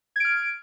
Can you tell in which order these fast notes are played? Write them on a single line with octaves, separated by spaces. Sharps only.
G#6 D7 F6